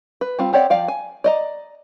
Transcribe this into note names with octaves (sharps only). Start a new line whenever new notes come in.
B4
G3 C4 F4
C4 G4 C#5 D5 F#5
F3 D5 F5 G5
G#5
D5 D#5 A#5